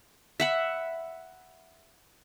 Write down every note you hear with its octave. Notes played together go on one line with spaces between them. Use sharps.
E5 F#5 B5